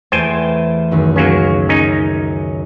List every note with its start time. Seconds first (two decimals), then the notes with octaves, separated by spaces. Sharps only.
0.12 E2 A3 C5 G5 G#5 A6
0.91 C#2 F#2 D#3
1.16 F#3 A#3 C#4 C#6
1.69 C#4 D#4